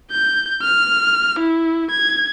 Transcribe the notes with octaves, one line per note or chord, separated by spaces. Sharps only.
G6
F6
E4
G#6